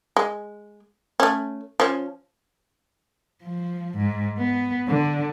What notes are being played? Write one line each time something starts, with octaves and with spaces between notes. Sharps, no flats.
G#3
A3 C#4
F3 C#4
F3
G#2
B3
D3